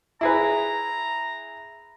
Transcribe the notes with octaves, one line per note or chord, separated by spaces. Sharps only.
E4 G#4 B4 A#5